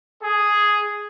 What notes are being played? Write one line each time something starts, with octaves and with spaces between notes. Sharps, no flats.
G#4